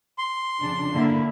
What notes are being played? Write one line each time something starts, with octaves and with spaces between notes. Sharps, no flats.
C6
F2 C#3 D4
D3 A#3 E4